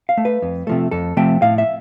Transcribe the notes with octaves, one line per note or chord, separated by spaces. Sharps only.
F5
A3
B4
F2
C3 F3 A3
F2 A4
C3 F3 A3 G5
A2 F5
E5